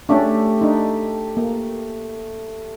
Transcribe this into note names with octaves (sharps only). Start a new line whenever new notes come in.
A3 C#4 D4 G4
D4 D#4
A#3